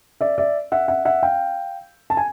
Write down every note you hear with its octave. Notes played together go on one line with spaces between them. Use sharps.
D5 E5
D5 E5
E5 F#5
E5 F#5
E5 F#5
F5 G5
A5
G#5